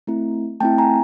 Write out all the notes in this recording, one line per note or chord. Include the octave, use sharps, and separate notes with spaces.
A3 C4 E4
A3 C4 E4 G5 A5
G#5 A#5